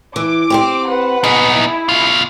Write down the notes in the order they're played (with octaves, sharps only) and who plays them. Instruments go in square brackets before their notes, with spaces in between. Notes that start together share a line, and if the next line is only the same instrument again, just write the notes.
[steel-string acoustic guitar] E3 [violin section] D6
[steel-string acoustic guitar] C4 G4 C5
[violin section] B4 F#5
[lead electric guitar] B3 D#4 [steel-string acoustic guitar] G#4
[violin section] E4
[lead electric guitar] B2 F4